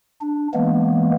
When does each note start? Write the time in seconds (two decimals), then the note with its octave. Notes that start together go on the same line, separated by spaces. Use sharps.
0.21 D4
0.54 E3 G#3 A#3 B3